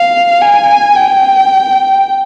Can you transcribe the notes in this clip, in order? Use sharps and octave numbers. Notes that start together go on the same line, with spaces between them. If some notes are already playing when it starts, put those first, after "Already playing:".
Already playing: F5
G#5
G5